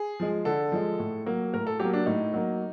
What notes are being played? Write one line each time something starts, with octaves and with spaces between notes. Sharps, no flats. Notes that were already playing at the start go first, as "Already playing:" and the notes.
Already playing: G#4
F3 G#3
D3 A4
F3 G#3
A2
F#3 A#3
A2 A#4
A4
F#3 A#3 G4
D4
A2 D#4
F#3 A#3